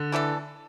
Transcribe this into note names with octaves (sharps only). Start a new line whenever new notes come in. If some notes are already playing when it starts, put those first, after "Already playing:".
Already playing: D3
E3 A3 D4 A4